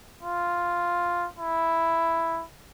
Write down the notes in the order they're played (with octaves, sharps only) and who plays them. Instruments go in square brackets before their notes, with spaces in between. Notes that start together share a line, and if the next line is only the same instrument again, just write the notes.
[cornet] F4
E4